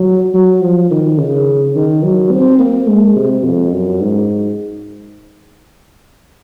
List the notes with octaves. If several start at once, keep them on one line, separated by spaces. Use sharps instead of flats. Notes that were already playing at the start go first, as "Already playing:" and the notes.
Already playing: F#3
F#3
F3
D#3
C#3
D#3
F#3
C4
A#3
G#3
C3
F2
F#2
G#2